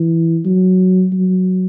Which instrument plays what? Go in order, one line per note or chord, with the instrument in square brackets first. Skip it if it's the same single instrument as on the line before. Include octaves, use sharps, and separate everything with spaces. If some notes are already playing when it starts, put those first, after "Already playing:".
Already playing: [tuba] E3
F#3
F#3